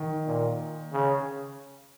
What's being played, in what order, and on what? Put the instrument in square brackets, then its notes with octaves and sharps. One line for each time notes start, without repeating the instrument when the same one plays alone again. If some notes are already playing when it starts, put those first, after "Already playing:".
Already playing: [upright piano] D#3
[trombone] A#2
C#3